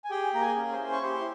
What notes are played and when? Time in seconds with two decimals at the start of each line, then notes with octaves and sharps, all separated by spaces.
0.04 G#5
0.10 G4 G#4 G5
0.34 A#3 A#5
0.41 G#4 G#5
0.57 C#4
0.72 C5 C6
0.79 E4
0.92 C#6
1.03 G4 C5 C6